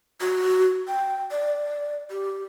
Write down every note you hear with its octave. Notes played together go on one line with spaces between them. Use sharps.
F#4
G5
D5
G4